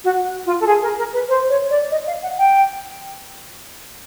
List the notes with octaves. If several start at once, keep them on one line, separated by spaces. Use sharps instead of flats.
F#4
F4
A4
G#4
A#4
A#4
B4
C5
C#5
D5
D#5
F5
F#5
G5